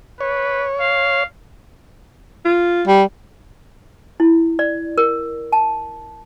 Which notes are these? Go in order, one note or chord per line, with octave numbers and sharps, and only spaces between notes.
B4 C#5
F5
F4
G3
E4
D5
A#4
A5